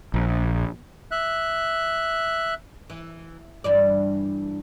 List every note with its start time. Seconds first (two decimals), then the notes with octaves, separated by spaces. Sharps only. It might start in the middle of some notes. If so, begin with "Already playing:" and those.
0.14 A#1
1.11 E5 F#6
2.90 E3
3.64 G2 E3 D5